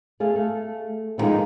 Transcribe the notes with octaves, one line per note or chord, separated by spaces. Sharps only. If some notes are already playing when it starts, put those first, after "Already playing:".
A3 G#4 A4 F5
A3
D3 D#3 F3 G#3 A#3 D#4